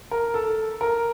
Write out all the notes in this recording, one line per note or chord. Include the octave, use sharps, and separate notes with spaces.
A#4
A4
A#4